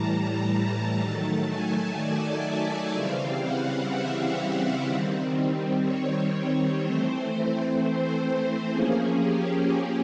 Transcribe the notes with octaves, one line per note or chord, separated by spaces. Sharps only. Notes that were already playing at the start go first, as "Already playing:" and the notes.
Already playing: A2 E3 G3 A5 A#5
D#3 F#3 A3 A5
G#5
D5
E5
C#3 E3 G3 C4 F5
F#5
E5
D#3 G3 C4
C#5
E3 A3 C4 C5
C5
F3 A#3 C#4 G#4
G4